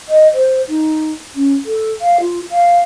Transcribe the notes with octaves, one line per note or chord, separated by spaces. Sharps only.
D#5
C5
D#4
C#4
A4
F5
F4
F5